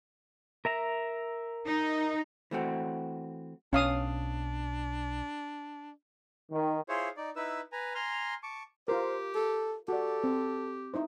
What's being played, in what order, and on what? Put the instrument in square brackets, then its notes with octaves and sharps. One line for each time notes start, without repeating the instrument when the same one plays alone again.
[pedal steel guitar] A#4 E5 A#5
[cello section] D#4
[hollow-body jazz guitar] E3 A3 C4 F#4
[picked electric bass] B1 [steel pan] C#4 F5 D#6 [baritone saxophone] D4
[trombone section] D#3
[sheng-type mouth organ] E4 F4 G#4 C5 C#5
D#4 D5
D#4 E4 B4 E6
B4 G#5 A#5
G#5 A#5 C6 F6
A5 C#6 D6
[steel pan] F4 A#4 [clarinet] G4 [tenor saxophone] C5
[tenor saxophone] A4
[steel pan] F#4 D5 [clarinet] G4 [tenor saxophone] A4
[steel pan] C4
D#4 E4 C5